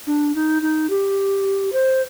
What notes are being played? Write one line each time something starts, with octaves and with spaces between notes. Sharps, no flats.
D4
D#4
D#4
G4
C5